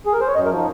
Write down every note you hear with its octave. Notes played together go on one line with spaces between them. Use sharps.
G#4
A#4
C5
C#5
F#2 D#5
A#4
F3 D#4